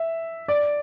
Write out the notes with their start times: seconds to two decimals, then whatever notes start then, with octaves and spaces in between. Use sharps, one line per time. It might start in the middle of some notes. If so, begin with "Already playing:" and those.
Already playing: E5
0.48 D5